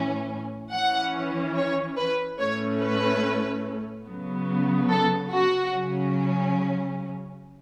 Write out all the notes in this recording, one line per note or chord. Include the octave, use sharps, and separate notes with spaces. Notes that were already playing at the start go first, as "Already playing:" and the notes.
Already playing: A2 E3 C#4
E3 C#4 F#5
C#5
B4
A2 A3 C#4 C#5
B4
C#3 F#3 B3
A4
F#4
C#3 F#3 C#4